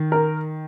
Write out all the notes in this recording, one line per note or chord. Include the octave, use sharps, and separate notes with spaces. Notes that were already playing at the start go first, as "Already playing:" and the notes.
Already playing: D#3
A#4